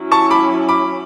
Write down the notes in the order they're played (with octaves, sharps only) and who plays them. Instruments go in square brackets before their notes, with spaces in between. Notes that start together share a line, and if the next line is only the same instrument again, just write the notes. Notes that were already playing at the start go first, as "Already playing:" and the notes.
Already playing: [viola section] F#3 C#4 E4
[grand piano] A5 C#6
B5 D6
B5 D6